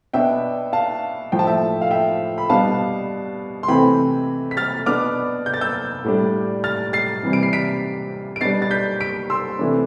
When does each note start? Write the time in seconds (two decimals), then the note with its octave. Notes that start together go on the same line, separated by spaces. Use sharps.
0.13 B2 B3 D4 E5 G5
0.73 F5 A5
1.32 A2 F3 A3 G5
1.39 A5
1.47 E5 G5
1.81 F5
1.91 E5 G5
2.38 B5
2.50 B2 G3 B3 D4 F5 A5
3.63 C6
3.68 C3 E3 A3 C4 G5 B5
4.51 B6
4.57 F6 A6
4.86 B2 B3 D4 D6 F6
5.46 G6
5.54 A6
5.61 E6 G6
6.04 A2 G3 D4
6.64 F6 A6
6.93 A6 C7
7.23 C3 E3 G3
7.33 D7
7.43 C7
7.53 B6 D7
8.36 D7
8.41 B2 G3 D4 A6 C7
8.62 A6
8.71 G6 B6
9.01 B6 D7
9.30 C6 E6
9.59 C3 E3 A3 D4